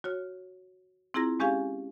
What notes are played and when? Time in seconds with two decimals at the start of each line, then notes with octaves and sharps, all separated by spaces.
0.04 F#4 C#5 F6
1.14 C4 E4 F4 G#4 A#5 A#6
1.40 G#3 C#4 G4 G#4 F5 G#5